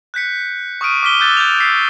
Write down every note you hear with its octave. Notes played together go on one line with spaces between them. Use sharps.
F#6 G6 B6 C#7
C#6 D#6 F6 D7 D#7
D6 D#6 F6 B6 D#7 G7
D6 E6 F#6 G6 A6
G6 F7
E6 A6 B6 C7